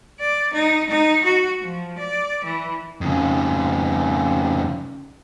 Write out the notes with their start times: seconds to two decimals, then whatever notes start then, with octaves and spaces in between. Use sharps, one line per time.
0.19 D5
0.53 D#4
0.89 D#4
1.24 F#4
1.61 F3
1.98 D5
2.44 E3
3.01 F2 C#3